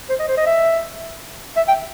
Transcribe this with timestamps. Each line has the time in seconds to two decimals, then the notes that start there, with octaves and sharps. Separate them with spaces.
0.09 C5
0.19 D#5
0.28 C5
0.37 D#5
0.46 E5
1.56 E5
1.68 G5